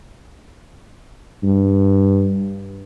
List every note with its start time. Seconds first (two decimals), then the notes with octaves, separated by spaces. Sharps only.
1.43 G2